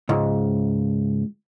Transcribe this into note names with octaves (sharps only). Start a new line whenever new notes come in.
C#2 G#2